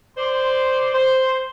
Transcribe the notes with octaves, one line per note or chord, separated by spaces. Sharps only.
C5 D5 C6
C5